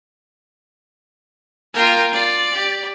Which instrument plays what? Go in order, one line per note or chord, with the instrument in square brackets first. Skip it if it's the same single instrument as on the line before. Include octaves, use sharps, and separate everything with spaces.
[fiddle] A#3 F4 [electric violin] A#4 G5
[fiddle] F4 [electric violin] D5
[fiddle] G4